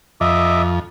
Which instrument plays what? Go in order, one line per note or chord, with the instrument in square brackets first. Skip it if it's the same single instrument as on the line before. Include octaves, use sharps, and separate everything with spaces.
[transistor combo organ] F2 [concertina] D#5 E5 D6